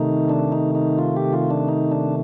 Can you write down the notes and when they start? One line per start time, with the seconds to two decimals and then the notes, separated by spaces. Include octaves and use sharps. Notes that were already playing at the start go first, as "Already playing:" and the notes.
Already playing: C3 D#3 A3 D#4
0.29 D4
0.52 D#4
0.75 D#4
0.98 F4
1.16 G4
1.33 F4
1.51 D4
1.68 D#4
1.91 D4